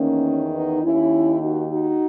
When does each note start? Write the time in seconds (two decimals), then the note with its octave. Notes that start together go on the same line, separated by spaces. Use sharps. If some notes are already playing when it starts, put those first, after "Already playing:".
Already playing: E2 D#3 A#3 C#4
0.53 B3 D#4
0.83 D#2 D#3 C#4 E4
1.41 D#4 F#4
1.70 D#4 F#4